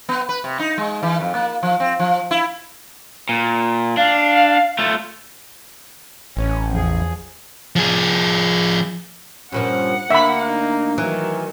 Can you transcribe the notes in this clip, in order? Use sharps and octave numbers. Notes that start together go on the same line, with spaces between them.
B3
B4
C3
D#4
G#3
E3
F2
A#3
F3
C4
F3
E4
A#2
D4 F5
A3 F4
A1 C#4
E2 F3 G#4
F3 G#4
G2 A#2 F3 C#4 F#5
D2 A#3 E5 B5
D#4
D#3 E3 F#3